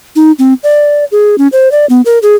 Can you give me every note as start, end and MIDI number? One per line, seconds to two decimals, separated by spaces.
0.16 0.32 63
0.39 0.54 60
0.63 1.05 74
1.12 1.36 68
1.38 1.47 61
1.52 1.71 72
1.72 1.86 74
1.90 2.01 59
2.06 2.19 70
2.23 2.35 68